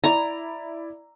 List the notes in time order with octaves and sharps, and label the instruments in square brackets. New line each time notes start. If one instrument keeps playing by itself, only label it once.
[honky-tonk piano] E4 D5 [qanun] A#5